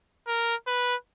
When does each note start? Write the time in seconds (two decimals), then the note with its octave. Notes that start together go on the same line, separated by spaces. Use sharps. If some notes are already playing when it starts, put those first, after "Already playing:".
0.27 A#4
0.67 B4